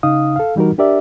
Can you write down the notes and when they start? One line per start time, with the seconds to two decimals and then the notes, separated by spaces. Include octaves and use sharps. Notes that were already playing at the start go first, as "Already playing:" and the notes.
0.03 C#3 D#4 F5 D#6
0.36 A4 F5
0.56 E3 G3 D#4 F#4 A#4
0.78 D4 G4 A#4 D5 E5